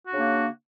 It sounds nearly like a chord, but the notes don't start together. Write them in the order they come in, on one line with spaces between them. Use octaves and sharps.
F#4 D4 C#3 A#3